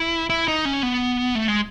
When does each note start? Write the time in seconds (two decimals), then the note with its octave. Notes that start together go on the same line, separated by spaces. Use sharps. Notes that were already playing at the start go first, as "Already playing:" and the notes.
Already playing: E4
0.30 E4
0.48 D#4
0.65 C#4
0.83 B3
1.35 A3
1.48 G#3